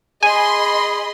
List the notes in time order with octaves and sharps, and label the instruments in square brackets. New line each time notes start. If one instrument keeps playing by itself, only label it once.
[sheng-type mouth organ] G#4 [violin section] D#5 B5 C6 [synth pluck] G#5